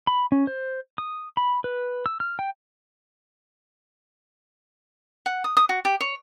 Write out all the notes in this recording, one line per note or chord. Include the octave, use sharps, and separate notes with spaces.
B5
C#4
C5
D#6
B5
B4
E6
F6
G5
F#5
D#6
D#6
F#4
G4
C#5